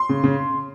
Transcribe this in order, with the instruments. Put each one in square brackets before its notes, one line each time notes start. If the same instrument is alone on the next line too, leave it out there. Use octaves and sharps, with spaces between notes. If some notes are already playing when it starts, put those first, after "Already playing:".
Already playing: [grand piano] C6
C#3
C#3